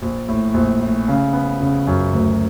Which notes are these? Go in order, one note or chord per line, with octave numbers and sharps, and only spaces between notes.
A#1
A2
A#1
A2
C#3
B3
C#3
F#2
D2